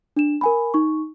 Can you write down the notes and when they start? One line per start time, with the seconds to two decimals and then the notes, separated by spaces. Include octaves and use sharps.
0.16 D4 E7
0.41 A#4 G#5 B5
0.74 D#4 C#6